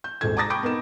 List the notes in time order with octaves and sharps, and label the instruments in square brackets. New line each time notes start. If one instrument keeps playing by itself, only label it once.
[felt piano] G6
D#1 G#1 G#3 A4 G#6
A5 A#5 D6 D#6 A6 A#6
G5 B5 C#6 D6 G6 D7
B3 D#4 A#4 E7